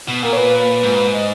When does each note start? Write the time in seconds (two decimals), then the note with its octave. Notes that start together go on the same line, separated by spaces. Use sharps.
0.08 B2
0.22 A#2 A#4
0.33 C#5
0.37 B4
0.83 G#2
1.14 D#5